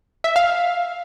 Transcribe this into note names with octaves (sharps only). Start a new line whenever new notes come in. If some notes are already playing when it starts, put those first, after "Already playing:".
E5
F5